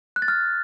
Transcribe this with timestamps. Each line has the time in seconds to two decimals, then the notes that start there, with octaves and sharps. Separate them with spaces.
0.16 F#6
0.22 A6
0.28 F6